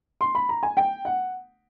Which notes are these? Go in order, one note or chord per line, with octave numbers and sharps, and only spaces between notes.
C6
B5
A#5
G#5
G5
F#5